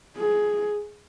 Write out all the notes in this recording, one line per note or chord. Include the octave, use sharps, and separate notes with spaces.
G#4